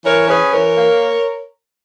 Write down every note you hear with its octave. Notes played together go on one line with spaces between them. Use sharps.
E3 A#4 C#5
C#4 G#4 B4
E3 A#4 C#5
A#3